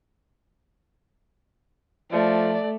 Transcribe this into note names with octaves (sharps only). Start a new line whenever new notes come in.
F3 A3 D5